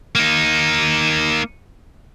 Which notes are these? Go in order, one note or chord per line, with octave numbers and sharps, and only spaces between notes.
A#3 D#4